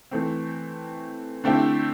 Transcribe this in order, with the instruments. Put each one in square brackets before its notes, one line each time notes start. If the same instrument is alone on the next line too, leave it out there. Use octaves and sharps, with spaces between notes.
[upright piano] E3 A3 C4
D3 A3 C4 E4 G4